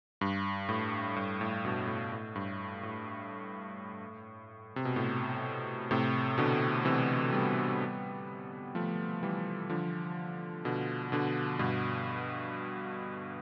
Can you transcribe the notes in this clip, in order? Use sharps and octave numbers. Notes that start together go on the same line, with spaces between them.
G2
A2
G2
A2
G2 B2
A2
A2
G2
A2
C3
B2
A2
A2 C3
B2 D3
C3 E3
G3 B3
F3 A3
E3 G3
D3 F3
B2 D3
B2 D3
G2 B2